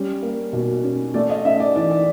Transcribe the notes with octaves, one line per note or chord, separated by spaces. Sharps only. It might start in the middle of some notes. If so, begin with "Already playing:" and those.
Already playing: G3 C#4
A#3
B2
C#4
A3 D5
D#5
C#4 E5
D5
E3 D5
D5